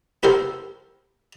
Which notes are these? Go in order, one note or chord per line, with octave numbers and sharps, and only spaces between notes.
B3 E4 G4 A4 A#4 C5